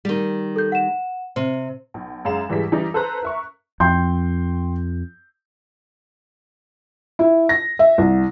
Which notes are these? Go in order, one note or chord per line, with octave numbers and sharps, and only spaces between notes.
D#3 G3
A4 G6
F#5 E7
C3 C5
B1
F#2 G#3 C#4 F5 E7
G#1 E3 G3 G#4 B6
E3 G3 D#4 G4
A4 B4 C5 A#5 F#6
A#4 E5 C#6
F2 G5 C6 G6
E4
A#6
E5
C2